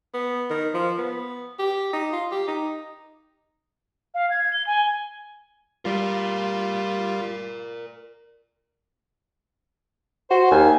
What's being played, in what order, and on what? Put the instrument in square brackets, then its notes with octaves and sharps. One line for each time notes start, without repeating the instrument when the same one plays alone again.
[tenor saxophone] B3
D#3
F3
B3
G4
D#4
F4
G4
D#4
[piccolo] F5
G#6
G7
G#5
[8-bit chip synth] G3 F4 [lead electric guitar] A#4 D5
[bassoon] F#4 [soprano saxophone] C5
[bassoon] D#2 [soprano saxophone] G#5